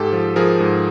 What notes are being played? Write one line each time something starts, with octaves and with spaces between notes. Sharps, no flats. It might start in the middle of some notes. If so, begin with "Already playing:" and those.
Already playing: G#2 G4 A4
F3
F3 G#4 A#4
G#2